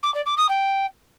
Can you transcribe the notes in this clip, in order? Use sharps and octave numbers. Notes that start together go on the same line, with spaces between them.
D6
D5
D6
D#6
G5